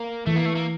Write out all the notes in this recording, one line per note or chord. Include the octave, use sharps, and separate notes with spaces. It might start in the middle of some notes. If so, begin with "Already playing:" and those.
Already playing: A#3
E3 A3
A#3
A3
A#3